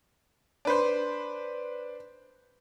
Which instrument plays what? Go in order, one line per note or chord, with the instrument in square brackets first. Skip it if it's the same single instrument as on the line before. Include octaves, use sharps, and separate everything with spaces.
[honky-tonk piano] D4 B4 C5